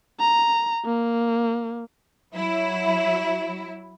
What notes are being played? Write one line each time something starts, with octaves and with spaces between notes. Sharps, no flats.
A#5
A#3
F#3 E4